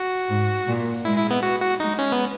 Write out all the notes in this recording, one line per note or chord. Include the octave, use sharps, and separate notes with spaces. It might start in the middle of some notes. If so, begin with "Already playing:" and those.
Already playing: F#4
G#2
A#2
G#3 E4
E4
B3
F#4
F#4
G#3 D#4
C#4
B3